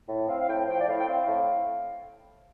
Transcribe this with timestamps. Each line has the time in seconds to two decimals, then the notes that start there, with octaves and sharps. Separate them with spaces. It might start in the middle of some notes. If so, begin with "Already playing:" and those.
0.08 A2
0.28 C4 F5
0.39 F5
0.48 A2 G5
0.68 F3 G5
0.80 D5
0.87 A2 F5
0.99 G5
1.07 C4 F5
1.27 A2